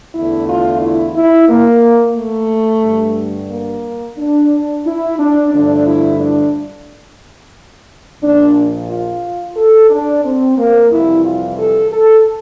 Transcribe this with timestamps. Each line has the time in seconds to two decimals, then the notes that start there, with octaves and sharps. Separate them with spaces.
0.15 E2 D3 A3 E4
0.48 F4
0.82 E4
1.16 E4
1.49 A#3
2.17 A3
2.84 G2 D3 G3
3.51 A#3
4.19 D4
4.86 E4
5.19 D4
5.53 G2 D3 F3 A3 D4
5.87 E4
6.20 D4
8.22 A#1 A#2 F3 D4
8.90 F4
9.57 A4
9.90 D4
10.24 C4
10.58 A#3
10.91 F2 C3 E3 G3 E4
11.25 F4
11.59 A4
11.92 A4